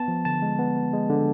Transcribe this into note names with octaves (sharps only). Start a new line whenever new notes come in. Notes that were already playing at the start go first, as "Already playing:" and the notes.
Already playing: B3 A5
F3
D3 A5
G#3
B3
B3
G#3
D3